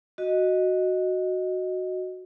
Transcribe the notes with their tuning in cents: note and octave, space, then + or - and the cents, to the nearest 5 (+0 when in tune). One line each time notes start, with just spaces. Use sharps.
F#4 +0 D#5 +0